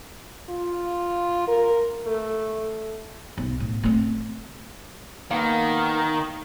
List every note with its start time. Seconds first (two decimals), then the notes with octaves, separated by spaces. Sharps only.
0.50 F4
1.48 A#4
2.07 A3
3.38 B1
3.60 A2
3.84 A3 C4
5.31 D#3 A#3 B3